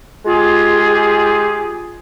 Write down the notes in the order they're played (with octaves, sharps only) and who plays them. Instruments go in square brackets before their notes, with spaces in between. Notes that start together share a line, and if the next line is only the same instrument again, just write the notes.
[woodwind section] G#3 F4 G4 G#4